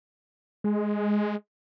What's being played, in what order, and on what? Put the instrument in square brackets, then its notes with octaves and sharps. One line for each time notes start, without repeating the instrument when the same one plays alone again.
[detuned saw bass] G#3